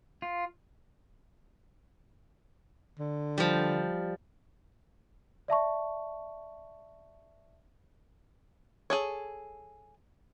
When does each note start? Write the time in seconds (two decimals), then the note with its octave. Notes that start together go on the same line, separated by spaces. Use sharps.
0.22 F4
2.99 D3
3.38 F3 G3
5.48 D5 E5 A5 C#6
8.90 G#4 A4 C#5